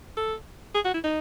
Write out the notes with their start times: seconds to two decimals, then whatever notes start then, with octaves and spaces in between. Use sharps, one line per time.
0.17 A4
0.75 G#4
0.85 F#4
0.94 E4
1.04 D#4